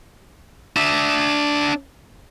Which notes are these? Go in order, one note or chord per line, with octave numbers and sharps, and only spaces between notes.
D4 E5